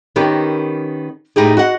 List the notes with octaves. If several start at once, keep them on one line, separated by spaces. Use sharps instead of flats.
D#3 B3 C#4 G4 A#4
A2 G#3 D#4 E4 G4 G#4
F#4 D#5 F#5